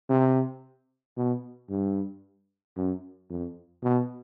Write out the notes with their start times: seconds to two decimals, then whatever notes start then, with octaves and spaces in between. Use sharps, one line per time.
0.10 C3
1.17 B2
1.70 G2
2.77 F#2
3.30 F2
3.83 B2